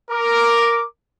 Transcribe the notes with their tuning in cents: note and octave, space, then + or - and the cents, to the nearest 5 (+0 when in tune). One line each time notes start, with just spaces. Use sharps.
A#4 +0 D6 +0